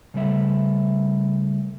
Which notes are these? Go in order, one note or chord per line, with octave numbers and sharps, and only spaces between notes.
C#3 G3 A3 E5